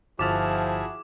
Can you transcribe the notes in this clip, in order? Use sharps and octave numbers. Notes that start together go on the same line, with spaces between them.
G1 F3 E4 F#4 G#4 A5 D6 F6